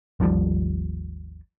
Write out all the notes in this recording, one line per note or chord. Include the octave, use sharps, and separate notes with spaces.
G#1 D#2 F3 G3